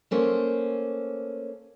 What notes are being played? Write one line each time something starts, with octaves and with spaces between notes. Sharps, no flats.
A3 A#3 C#4 C5